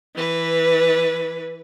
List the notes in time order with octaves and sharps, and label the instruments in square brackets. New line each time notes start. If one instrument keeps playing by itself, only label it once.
[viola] E3 B4